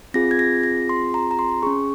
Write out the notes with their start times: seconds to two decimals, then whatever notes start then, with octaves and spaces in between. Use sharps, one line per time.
0.14 C4 F4 G#4 A#6
0.31 G#6
0.39 A#6
0.63 A#6
0.89 C6
1.14 A#5
1.31 A#5
1.39 C6
1.63 C#4 G#4 C#6